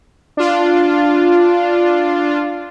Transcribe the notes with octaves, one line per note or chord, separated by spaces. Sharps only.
D4 F4